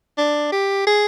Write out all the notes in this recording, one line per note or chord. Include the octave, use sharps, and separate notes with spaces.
D4
G4
G#4